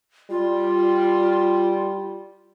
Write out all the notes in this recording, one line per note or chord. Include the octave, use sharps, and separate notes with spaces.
G3 F4